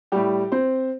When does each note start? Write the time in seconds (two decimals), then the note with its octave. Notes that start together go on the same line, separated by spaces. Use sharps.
0.12 A2 G3 G4
0.52 C4 C5